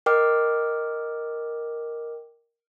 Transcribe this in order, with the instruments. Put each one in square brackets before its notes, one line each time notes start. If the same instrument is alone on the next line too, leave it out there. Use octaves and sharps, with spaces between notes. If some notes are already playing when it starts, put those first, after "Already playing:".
[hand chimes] A#4 D#5 G5 D6 F6